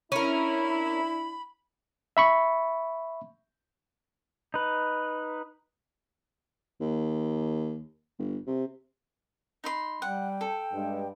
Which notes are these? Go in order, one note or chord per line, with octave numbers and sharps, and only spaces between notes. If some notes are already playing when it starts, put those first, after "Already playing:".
C#4 D4 E4 A#4 B5
E5 B5 C#6
D#4 B4
D#2
G1
C3
D#4 B5 C6
G3 F#5 G5
A4
G2 G#3